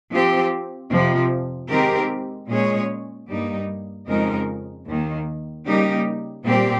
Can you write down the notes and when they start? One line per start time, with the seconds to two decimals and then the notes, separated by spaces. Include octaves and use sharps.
0.12 F3 C4 G4
0.91 F2 C3 F3
1.70 D#3 G#3 C4 G4 A#4
2.49 A#2 G#3 C#4 G#4 C#5
3.29 G2 G3 A#3 D#4
4.08 F2 C#3 G#3 D#4 A#4
4.87 D#2 D#3 A#3
5.66 C#3 G3 A#3 D#4 G4
6.45 A#2 G3 C4 G4